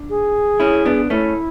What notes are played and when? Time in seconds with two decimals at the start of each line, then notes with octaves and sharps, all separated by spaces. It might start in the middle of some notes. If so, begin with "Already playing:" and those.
Already playing: D4
0.10 G#4
0.60 C#4 E4
0.85 B3 D4
1.10 A3 C#4 E4